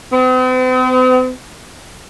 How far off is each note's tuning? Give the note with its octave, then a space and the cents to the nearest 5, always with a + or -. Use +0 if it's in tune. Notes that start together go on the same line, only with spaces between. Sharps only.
C4 -45